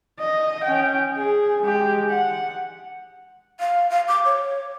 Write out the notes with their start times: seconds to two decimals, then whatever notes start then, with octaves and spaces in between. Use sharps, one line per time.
0.19 D#5
0.64 C#4 G5
1.17 G#4
1.62 G#3 G4
2.10 F#5
3.60 F5
3.90 F5
4.08 D6
4.25 C#5